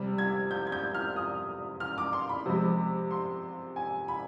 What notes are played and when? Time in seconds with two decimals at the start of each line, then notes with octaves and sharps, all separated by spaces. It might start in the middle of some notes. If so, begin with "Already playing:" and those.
Already playing: C3 G3
0.18 G#6
0.51 G6
0.67 G#6
0.72 G6
0.94 F6
1.16 D#6
1.80 F6
1.98 D6
2.13 C6
2.29 B5
2.46 C3 F3 G#3
3.11 C6
3.76 G#5
4.08 B5